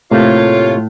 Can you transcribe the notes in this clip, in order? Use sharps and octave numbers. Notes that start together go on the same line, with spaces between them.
A2 C3 A3 A#3 F4 C#5